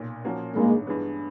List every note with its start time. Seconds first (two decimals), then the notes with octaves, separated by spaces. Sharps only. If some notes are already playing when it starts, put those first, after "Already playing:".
Already playing: B1 A#2
0.24 A#2 F3 A#3 C#4 F#4
0.55 A1 G2 D#3 G#3 A#3
0.87 G2 E3 G#3 B3